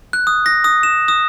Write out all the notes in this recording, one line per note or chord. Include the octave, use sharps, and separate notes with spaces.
F#6
D#6
A#6
D#6
E7
D#6